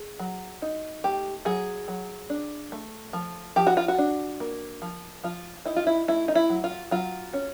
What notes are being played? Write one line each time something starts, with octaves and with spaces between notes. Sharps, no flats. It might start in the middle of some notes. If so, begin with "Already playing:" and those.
Already playing: G#4
F#3
D#4
A3 G4
F#3 G#4
F#3
D4
A3
F3
F3 G4
F#4
F4
F#4
D4
A#3
F3
F3 F4
D#4 E4
F4
E4
A3 E4
D#4
E4
F#3
F4
F#3 F4
C#4